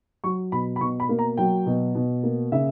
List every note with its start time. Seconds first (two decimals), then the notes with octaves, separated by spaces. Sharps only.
0.24 F#3 C#6
0.52 B2 B5
0.76 B5
0.80 B2 C#6
1.00 B5
1.09 A#3
1.19 A#5
1.37 F#3 G5
1.66 B2
1.95 B2
2.23 A#3
2.52 C#3 E5